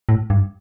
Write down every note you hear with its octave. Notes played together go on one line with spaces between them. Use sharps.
A2
G2